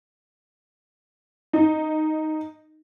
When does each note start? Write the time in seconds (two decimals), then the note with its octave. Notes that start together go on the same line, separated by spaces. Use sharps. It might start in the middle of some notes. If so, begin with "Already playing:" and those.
1.53 D#4